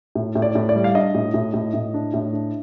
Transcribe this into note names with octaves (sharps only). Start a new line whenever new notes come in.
A2
A2
D5
A2
D5
G3
F5
D4 D#5
A2
A2
A2
A2
D4
A2
D4